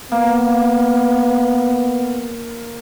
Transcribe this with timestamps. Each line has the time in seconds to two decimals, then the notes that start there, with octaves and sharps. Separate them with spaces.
0.12 A#3 B3